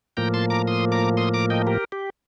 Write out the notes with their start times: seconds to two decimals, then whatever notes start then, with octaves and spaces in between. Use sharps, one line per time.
0.17 A2 F3 A#3 G5 A#5
0.34 A5 C6
0.50 A#5 D6
0.67 C6 D#6
0.92 A#5 D6
1.17 C6 D#6
1.34 A#5 D6
1.50 D#5 G5
1.67 G4 A#4
1.92 G4